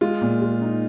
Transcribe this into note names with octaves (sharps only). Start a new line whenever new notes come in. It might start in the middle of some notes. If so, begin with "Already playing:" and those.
G#3 F4
A#2
G#3
D#4